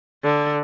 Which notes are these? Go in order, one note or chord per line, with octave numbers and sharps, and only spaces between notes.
D3